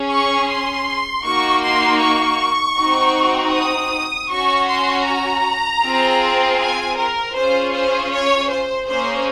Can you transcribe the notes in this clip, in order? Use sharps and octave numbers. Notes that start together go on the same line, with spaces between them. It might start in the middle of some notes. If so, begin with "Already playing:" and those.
Already playing: C#4 G#4
C#6
C6
A#3 D#4 F#4 C#6
C6
C#6
C4 D#4 F#4
D#6
C#4 F#4 C#6
C6
A#5
C4 F4 G#4
G#5
A#4
C#4 F4 G#4 C5
C5
C#5
C5
A#3 C#4 G#4 C5